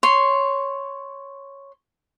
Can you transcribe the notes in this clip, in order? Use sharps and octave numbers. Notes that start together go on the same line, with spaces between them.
C#5 C6